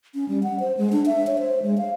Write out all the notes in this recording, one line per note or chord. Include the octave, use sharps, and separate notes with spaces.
C#4
G3
F#5
C5
G#3
D4
E5
C#5
C5
G#3
F5